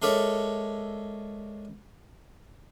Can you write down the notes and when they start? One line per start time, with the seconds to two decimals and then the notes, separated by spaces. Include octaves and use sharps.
0.02 G#3 A4 A#4 C#5 D5 E5